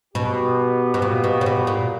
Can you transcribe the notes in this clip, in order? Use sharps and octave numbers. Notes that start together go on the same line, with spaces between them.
B2 B3 D#4 G4
B2
A#2
B2
C#3
B2
A#2